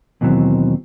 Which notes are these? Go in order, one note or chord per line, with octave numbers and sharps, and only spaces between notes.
D#2 B2 E3 F#3 C4